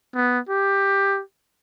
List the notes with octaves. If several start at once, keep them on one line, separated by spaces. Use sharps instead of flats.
B3
G4